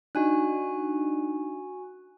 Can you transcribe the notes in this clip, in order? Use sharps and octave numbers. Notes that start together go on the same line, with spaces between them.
D4 D#4 F#4 G#5 F#6